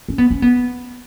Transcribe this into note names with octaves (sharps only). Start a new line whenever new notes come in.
C#4
B3
C#4
B3